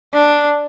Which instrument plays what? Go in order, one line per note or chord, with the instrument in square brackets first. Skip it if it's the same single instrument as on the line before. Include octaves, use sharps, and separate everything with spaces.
[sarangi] D4